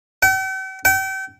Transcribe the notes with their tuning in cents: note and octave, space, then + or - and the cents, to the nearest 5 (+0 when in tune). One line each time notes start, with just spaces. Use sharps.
G5 -45
G5 -35